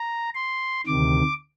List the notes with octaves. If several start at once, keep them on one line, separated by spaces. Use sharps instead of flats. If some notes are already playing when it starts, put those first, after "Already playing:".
Already playing: A#5
C6
D2 C3 D#3 D6